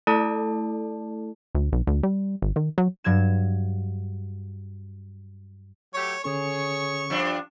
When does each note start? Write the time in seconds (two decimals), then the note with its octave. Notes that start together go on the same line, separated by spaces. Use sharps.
0.07 A3 E4 A4 D5 A5
1.55 D2
1.73 B1
1.87 D2
2.03 G3
2.42 G#1
2.56 D#3
2.78 F#3
3.04 G2 F#3 G#6 E7
5.94 F#3 A3 G4 C#5
6.24 D3 C#4 G#4 A4 C#5 C#6
7.10 G2 F3 D4